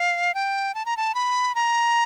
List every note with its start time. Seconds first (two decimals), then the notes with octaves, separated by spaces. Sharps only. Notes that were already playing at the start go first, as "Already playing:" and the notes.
Already playing: F5
0.35 G5
0.75 A5
0.86 A#5
0.97 A5
1.15 B5
1.55 A#5